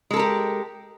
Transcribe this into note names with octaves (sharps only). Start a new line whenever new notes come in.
G#3 G4 A4 A#4